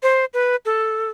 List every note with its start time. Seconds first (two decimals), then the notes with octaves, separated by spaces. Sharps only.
0.03 C5
0.34 B4
0.65 A4